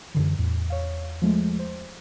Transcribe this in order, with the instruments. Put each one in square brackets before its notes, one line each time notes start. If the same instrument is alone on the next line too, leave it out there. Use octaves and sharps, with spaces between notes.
[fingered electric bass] F#2 D3 E3
[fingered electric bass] E2 [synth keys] A2
[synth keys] C#5 F5
F3 G#3 A3
C5